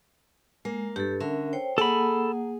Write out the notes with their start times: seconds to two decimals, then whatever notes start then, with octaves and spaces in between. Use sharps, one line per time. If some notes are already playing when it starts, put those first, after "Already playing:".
0.65 G#3 A#3
0.96 G2 G4 A4
1.20 D3 C#4 A#4 E5
1.53 C5 C#5 G5
1.78 A#3 G#4 A4 F#5 B5